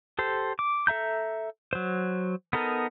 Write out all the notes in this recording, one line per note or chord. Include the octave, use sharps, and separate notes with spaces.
G4 A4 C5
D6
A4 E5 A#5 G6
F#3 C5
B3 D#4 A4 A#4